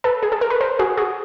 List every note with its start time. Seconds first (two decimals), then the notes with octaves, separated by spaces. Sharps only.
0.04 A4 B4
0.23 G#4
0.32 A4
0.41 A#4
0.50 B4
0.61 A#4 C5
0.79 F#4 G#4
0.97 F#4 G#4